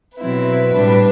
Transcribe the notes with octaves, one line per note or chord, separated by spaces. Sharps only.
B2 F#3 C4 E4 B4
A2 G3 D4